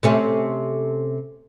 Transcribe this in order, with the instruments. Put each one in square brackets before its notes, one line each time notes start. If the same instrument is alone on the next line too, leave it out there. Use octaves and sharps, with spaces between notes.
[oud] C3 A3 C#4